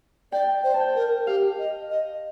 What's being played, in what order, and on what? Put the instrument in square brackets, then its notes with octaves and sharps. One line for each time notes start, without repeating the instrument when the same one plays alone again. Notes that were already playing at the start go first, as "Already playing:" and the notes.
[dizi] D5 [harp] G5
[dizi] C5
[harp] A5
G5
[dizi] A#4
[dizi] G4 [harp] F5
[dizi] D#5
D#5